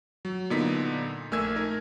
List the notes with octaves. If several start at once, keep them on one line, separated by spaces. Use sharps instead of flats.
F#3
A#2 D3 B3 D#4 B6
A#1 A3 A#4 G#5 E6 G#6
D#4 A#4